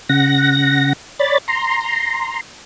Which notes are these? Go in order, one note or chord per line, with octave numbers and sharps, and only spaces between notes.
C#3 F#5 A#6
C#5 D5 B5 A6
A#5 C6